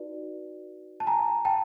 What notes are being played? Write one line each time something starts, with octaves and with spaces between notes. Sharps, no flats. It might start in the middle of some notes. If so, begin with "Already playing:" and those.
Already playing: D#4 F#4 B4 D5
A5
G#5 A#5
G5 A5